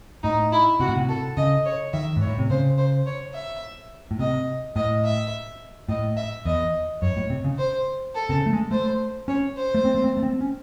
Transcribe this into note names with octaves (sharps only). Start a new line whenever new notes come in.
A2 D#4
E4
C3 F#4
A2
C3
A4
C#3 D#5
C#5
D#3 E5
G#2 C#5
A2
C3
C#3 C5
C5
C#5
E5
A2
C3 D#5
A2 D#5
E5
A2 D#5
E5
E2 D#5
F#2 C#5
A2
C3
C#3
C5
A4
C3
C#3
A3
G#3
A3 C5
C#4 C#5
C5
A3
C4
A3
C4
A3
C4
C#4